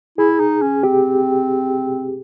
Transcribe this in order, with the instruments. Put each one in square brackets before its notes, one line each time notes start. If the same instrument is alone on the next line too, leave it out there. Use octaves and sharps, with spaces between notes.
[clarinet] E4 [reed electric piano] G#4
[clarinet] D#4
C#4
[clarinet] C4 [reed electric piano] G4